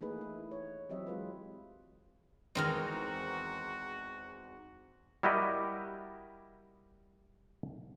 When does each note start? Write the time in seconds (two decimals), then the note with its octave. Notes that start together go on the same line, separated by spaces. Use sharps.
0.01 E3 A3 A#3 D#4 G#4 B4
0.21 E4
0.51 C#5
0.89 E3 F#3 C4 G4 D#5 E5
1.07 G#3 F4 B4
2.55 E2 D#3 G#3 C4 D#4 F#4 A#4 F6
5.23 G3 E4 F#4 G4 A#4 D#5